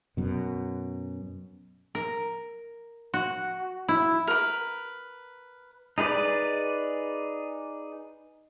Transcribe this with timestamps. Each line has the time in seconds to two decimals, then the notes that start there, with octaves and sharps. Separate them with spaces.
0.17 F#2 B2
1.95 A#4
3.14 F#4
3.88 E4
4.27 A#4 B4
5.98 D#4 G#4 B4 D5